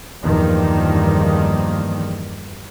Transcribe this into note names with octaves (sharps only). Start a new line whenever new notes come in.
E2 G2 D#3 F3 A#3